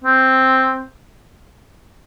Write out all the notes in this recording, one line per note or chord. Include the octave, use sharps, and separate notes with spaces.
C4